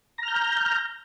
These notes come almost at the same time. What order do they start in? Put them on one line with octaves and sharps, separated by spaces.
A#5 F6 G6